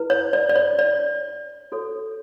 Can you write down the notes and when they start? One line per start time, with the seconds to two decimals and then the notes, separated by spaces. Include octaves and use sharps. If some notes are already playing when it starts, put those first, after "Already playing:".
Already playing: E4 B4
0.10 C#5
0.33 D5
0.49 D5
0.56 C#5
0.79 D5
1.72 F#4 A4 C#5